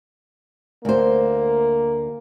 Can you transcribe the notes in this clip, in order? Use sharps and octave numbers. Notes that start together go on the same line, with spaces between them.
D2 A#3 C5